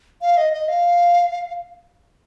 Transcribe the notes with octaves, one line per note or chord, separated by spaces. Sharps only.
F5
D#5
D#5
F5